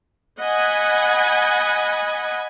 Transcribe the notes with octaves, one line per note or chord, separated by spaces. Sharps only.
D#5 F#5 G#5 B5